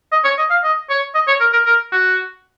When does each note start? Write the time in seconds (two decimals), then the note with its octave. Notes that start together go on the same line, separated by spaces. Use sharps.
0.12 D#5
0.25 C#5
0.38 D#5
0.50 F5
0.64 D#5
0.89 C#5
1.15 D#5
1.28 C#5
1.41 A#4
1.53 A#4
1.66 A#4
1.92 F#4